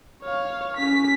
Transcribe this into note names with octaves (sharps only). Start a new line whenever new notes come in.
C#5 F5
C#4 B6